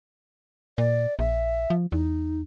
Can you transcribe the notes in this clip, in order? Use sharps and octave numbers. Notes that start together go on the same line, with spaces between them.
A#2 D5
A#1 E5
F3
E2 D#4